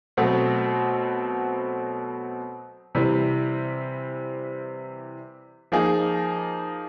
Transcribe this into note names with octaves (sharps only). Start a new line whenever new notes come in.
B2 F#3 A3 C4
C3 E3 G3 C4
F3 A#3 D#4 G#4